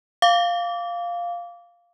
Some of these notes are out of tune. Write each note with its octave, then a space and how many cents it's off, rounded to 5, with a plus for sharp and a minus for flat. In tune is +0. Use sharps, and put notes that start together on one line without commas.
F5 +0 D6 -25